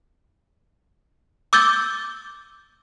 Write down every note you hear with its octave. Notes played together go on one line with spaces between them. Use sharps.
D6 E6 G6 A6 G7